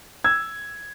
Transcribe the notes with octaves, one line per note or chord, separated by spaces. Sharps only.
E6 G#6